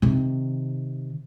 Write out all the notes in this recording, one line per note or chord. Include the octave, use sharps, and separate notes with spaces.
C3 D#3